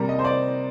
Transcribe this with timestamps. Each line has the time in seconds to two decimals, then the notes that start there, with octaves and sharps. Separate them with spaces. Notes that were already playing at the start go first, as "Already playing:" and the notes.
Already playing: C3 G3 A#3 A#5
0.09 D#5
0.19 C5
0.25 D5